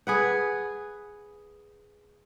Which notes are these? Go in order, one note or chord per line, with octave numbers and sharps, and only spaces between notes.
G#4 B4 F#5